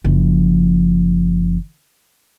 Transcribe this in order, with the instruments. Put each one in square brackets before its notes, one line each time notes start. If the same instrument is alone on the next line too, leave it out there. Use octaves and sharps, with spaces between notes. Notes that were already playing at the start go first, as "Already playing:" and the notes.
[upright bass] F#1 F3